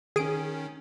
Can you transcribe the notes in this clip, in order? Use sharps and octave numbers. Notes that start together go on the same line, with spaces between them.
D#3 C#4 G#4 D#6 D7